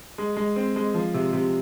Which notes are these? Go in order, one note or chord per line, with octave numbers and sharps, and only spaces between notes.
G#3
G#3
C4
G#3
F3
C3
C3